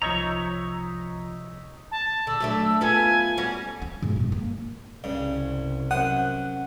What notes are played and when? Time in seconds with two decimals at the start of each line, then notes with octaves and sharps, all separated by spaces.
0.02 C2 C3 F3 D#4 C#5 E5 A#5 C#6
1.91 A5
2.27 D3 E6
2.40 F#3 A3 D4
2.81 B3 F4 A4 G#5
3.37 G3 C#4 F#4
3.82 C4
4.02 G#2 B2
4.16 F#2 G#3
4.32 A#3
5.04 C2 G2 C#3
5.91 F#2 C5 F#5 D#6